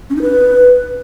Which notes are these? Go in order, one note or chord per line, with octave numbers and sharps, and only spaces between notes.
C#4
D#4
B4